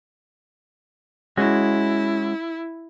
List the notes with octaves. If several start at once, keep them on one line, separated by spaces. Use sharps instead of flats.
G#3 C#4 E4 F#4